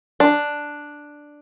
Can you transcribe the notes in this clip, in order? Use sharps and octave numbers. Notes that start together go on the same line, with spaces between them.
D4